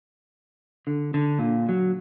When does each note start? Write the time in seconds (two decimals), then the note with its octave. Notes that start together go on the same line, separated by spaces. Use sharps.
0.87 D3
1.14 D3
1.39 A#2
1.69 F#3